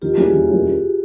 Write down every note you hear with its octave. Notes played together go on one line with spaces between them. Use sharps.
D#3 F4 G4
G3 A#3 C#4 E4 F#4 G#4
D#3
G3 A#3 C#4 E4